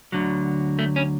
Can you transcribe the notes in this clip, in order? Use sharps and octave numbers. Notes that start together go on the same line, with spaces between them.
D2 D3 F#3
A3
C#4